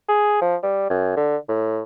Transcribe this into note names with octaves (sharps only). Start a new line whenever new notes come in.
G#4
F3
G3
F#2
D3
A2